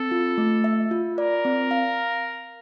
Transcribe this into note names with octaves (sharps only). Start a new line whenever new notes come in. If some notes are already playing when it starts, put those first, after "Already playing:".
Already playing: C4 A4
F4
A3
E5
F4
A#4 D5
C4
F5